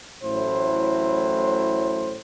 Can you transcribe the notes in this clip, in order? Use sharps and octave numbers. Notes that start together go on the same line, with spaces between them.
A1 A2 F#3 E4 C5